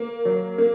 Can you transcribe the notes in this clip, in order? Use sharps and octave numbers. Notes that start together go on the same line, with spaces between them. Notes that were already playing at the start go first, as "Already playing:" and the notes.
Already playing: A#3
F#3
A#3